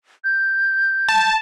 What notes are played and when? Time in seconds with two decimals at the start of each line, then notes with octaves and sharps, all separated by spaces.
0.24 G6
1.09 A5